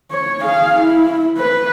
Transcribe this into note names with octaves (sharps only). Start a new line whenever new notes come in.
C#5
G#4 F5
E4
B4